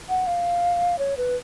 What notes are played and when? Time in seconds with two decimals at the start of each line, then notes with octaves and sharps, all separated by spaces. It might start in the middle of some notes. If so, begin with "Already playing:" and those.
0.09 F#5
0.27 F5
0.99 C#5
1.17 B4